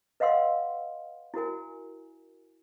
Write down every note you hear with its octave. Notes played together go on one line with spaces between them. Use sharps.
B4 D#5 F5 F#5 C6 E6
E4 F#4 A#4 G#5